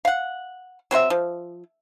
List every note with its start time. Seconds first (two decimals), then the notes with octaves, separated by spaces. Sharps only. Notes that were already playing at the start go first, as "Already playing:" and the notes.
0.05 F5 F#5
0.91 F#3 C4 C5 E5
1.10 F3